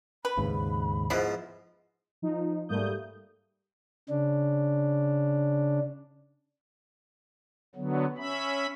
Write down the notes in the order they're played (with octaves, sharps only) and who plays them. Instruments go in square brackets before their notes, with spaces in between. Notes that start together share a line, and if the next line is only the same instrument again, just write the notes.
[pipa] B4 [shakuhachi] B5
[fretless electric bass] D#2 G#2 C#3
[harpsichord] G#2 F3 [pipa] B3 E4
[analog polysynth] F3 D#4
G#2 G3 A3 A#3 D#6 G6
[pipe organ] C#3 D4
D3 F#3 B3
C#4 E5 B5